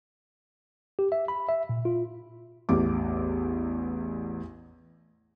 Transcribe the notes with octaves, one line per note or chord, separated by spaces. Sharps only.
G4
E5
B5
E5
A#2
F4
A1 E2 D6